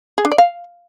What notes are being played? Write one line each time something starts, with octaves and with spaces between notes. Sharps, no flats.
G#4
D4
D5
F5